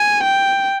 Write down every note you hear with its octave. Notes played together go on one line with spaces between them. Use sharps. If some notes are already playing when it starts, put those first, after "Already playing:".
Already playing: G#5
G5